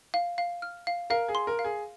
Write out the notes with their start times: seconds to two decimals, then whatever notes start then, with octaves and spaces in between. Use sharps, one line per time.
0.14 F5
0.38 F5
0.62 F6
0.87 F5
1.10 A#4 F5
1.28 G#4
1.35 C6
1.47 A#4
1.59 F5
1.64 G#4